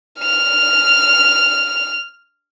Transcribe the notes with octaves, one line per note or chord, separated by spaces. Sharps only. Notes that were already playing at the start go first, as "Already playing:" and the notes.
F6 F7